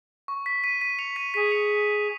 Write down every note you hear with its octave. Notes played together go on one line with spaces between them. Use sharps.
C#6
B6
B6 D#7
B6 D#7
C#7 F7
B6 D#7
G#4 B6 D#7
C#7 F7